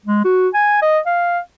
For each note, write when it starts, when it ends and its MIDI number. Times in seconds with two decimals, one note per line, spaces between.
0.06 0.22 56
0.24 0.48 66
0.54 0.79 80
0.82 0.99 75
1.06 1.38 77